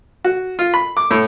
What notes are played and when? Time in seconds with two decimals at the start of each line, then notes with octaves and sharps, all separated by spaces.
0.24 F#4
0.59 F4
0.74 B5
0.97 D6
1.11 A2